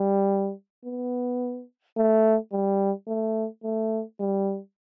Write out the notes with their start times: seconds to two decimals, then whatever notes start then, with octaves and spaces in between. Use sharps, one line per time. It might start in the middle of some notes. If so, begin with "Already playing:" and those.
Already playing: G3
0.85 B3
1.97 A3
2.53 G3
3.08 A3
3.64 A3
4.20 G3